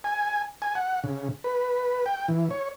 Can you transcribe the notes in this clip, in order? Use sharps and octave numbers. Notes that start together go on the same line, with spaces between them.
G#5
G#5
F#5
C#3
B4
G5
E3
C#5